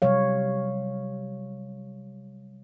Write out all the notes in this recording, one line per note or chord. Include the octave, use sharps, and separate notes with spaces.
C3 F#3 G3 C#5 F5